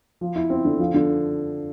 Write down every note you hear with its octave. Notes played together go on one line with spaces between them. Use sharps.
F3
E4
C4
D3
F3
D3